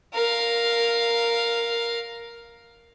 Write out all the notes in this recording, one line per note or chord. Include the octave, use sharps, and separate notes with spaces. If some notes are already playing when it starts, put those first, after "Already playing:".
A#4 F5